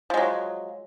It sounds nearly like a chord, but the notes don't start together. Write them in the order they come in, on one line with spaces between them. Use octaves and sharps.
F3 G#3 F#3